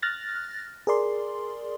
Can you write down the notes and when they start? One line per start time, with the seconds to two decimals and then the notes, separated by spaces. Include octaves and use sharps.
0.02 F6 F#6 A6 A#6
0.87 G#4 A#4 D5 C6